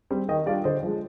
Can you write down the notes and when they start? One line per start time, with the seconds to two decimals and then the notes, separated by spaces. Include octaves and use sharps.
0.11 G3 C4
0.28 D#3 D#5 G5
0.46 G3 D4 F4 D5 F5
0.64 D3 C5 D#5
0.83 F3 G#3